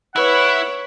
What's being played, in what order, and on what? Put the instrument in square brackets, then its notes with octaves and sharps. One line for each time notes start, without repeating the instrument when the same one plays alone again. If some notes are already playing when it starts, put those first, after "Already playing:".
[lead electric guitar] E4 [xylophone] B4 B5 [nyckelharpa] C#5 [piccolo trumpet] F#5